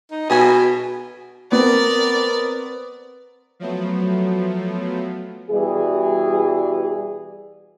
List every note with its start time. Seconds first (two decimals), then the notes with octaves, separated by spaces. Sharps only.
0.11 D#4
0.30 B2 G#4 G#5
1.52 B3 C4 A#4 D5
3.60 F3 F#3 A3 B3
5.51 B2 E3 G3 G#4